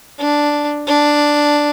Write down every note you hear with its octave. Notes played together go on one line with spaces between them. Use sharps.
D4
D4